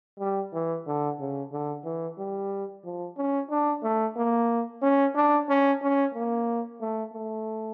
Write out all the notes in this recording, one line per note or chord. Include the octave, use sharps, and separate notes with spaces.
G3
E3
D3
C#3
D3
E3
G3
F3
C#4
D4
A3
A#3
C#4
D4
C#4
C#4
A#3
A3
A3